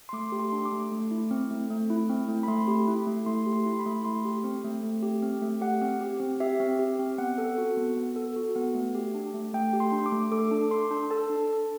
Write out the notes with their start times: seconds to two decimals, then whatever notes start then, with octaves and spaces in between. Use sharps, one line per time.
0.09 C6
0.13 A3 D6
0.32 G4
0.40 C6
0.52 D4
0.65 D6
0.72 A3
0.92 A3
1.11 E4
1.31 C4
1.51 A3
1.70 A3
1.90 E4
2.09 C4
2.28 A3
2.43 B5
2.48 A3 C6
2.68 G4
2.88 E4
3.07 A3
3.26 A3 C6
3.46 G4
3.53 C6
3.65 E4
3.79 B5
3.86 A3
4.04 A3 C6
4.25 G4
4.44 C4
4.64 A3
4.83 A3
5.02 G4
5.23 C4
5.42 A3
5.61 G4 F#5
5.81 C4
6.01 G4
6.20 C4
6.40 G4 E5
6.60 C4
6.79 G4
6.99 C4
7.18 B3 F#5
7.38 A4
7.58 F#4
7.77 B3
7.97 B3
8.16 A4
8.36 F#4
8.56 B3
8.75 A3
8.95 G4
9.15 D4
9.34 A3
9.54 A3 G5
9.73 G4
9.80 C6
9.92 D4
10.06 D6
10.12 A3
10.31 A4 D6
10.51 D4
10.71 A4 C6
10.91 D4
11.10 A4 A5
11.29 D4
11.49 A4